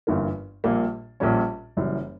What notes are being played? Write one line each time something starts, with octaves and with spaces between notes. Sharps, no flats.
G1 G2 E3 A#3
A#1 A#2 G3 A#3
A#1 A#2 G3 C#4
F#1 F#2 E3 G3